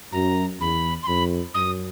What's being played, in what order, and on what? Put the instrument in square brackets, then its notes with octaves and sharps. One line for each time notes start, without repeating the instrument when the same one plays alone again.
[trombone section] F#2 [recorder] A#5
[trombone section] E2 [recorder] B5
[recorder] C6
[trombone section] F2 [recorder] B5
[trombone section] F#2 [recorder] D#6